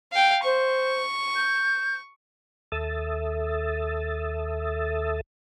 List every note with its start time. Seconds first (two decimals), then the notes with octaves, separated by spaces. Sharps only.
0.12 F5 G5
0.44 C5 C#6
1.36 G6
2.72 D#2 A4 E5 D#6 E6 A6